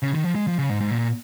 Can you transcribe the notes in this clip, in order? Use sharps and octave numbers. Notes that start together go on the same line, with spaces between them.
C#3
D#3
F3
G#3
F3
C#3
G#2
G#2
A#2